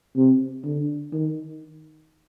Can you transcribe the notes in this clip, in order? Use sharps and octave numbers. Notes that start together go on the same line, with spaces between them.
C3
D3
D#3